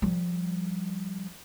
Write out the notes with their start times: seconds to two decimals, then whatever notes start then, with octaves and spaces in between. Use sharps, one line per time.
0.02 F3 G3